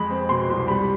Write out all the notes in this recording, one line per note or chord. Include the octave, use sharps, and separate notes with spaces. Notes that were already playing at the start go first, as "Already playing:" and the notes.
Already playing: F2 G#3 B5
C4
B2 C6
C2
G3 B5